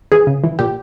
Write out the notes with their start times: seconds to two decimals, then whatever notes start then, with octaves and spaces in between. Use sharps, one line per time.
0.12 E3 G#4
0.27 C#3
0.44 E3
0.59 A#2 G4